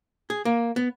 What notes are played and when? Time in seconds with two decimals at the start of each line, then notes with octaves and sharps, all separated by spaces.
0.30 G#4
0.45 A#3
0.76 B3